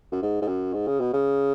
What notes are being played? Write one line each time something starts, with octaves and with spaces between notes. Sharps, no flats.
F#2
G#2
G#2
F#2
G#2
C#3
B2
C#3